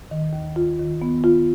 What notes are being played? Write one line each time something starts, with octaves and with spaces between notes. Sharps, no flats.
D#3
D#2
F4
D#3
B3
F4